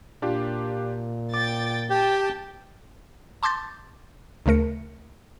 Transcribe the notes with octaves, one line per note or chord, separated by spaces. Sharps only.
A#2 D4 F4 G4
G5 D6 A6
G4 G5 A5
A5 C6 D6 G6 A6
D2 C#3 A3 A#4 C#7